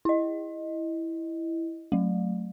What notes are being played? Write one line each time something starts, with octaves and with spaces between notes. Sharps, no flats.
E4 D#5
F#3 A3